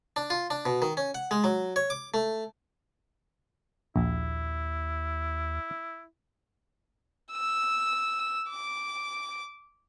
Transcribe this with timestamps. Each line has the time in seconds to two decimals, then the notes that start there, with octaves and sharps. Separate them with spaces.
0.16 D4
0.30 F4
0.50 D4
0.66 B2
0.82 D#3
0.97 C#4
1.15 F#5
1.31 G#3
1.44 F#3
1.76 C#5
1.90 D6
2.14 A3
3.96 A#1 D#2 E4
7.32 E6
8.50 D6